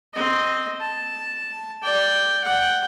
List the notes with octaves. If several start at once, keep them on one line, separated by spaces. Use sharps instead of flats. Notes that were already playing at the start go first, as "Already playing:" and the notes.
C4 D#5
A5
D5 G5
F#5 G5